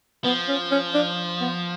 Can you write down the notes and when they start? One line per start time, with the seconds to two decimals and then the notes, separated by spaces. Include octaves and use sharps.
0.24 F3 B3
0.48 C#4
0.71 C#4
0.94 D4
1.41 B3